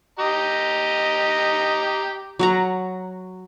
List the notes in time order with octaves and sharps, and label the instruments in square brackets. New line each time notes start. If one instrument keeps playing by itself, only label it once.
[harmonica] G4 D#5 A#5
[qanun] F#3 F#5 A#5